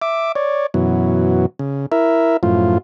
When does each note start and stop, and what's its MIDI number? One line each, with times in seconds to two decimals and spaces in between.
0.02 0.32 76
0.02 0.32 86
0.35 0.66 73
0.35 0.66 74
0.74 1.46 42
0.74 1.46 47
0.74 1.46 52
0.74 1.46 54
1.59 1.86 49
1.92 2.37 64
1.92 2.37 70
1.92 2.37 76
2.43 2.78 42
2.43 2.78 45
2.43 2.78 53
2.43 2.78 65